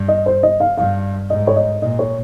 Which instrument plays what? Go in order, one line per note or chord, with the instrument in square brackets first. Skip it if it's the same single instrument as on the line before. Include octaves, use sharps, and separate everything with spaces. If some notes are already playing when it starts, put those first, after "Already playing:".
Already playing: [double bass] G2
[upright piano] D#5
C5
D#5
F5
[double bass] G2 [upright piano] F5
[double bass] G#2 [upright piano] D#5
[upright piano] C#5
D#5
[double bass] A#2 [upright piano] D#5
[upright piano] C#5